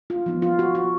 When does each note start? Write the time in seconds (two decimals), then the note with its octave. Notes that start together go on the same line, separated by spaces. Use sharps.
0.10 F4
0.26 F3 B3 D#4
0.42 F4
0.59 F#4
0.75 F#4